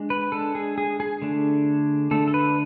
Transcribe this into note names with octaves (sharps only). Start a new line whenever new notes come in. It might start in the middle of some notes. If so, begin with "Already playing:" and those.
Already playing: G#3 D4
B4
G#3 D4 A4
G#4
G#4
G#4
D3 A3 D4
D3 A3 D4 A4
A4
B4